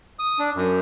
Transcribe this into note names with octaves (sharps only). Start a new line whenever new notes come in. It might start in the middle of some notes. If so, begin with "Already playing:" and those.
D#6
D4
F#2